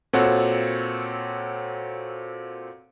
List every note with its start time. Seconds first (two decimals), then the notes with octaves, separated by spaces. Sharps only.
0.13 A#2 C4 F#4 A4 C#5 F#5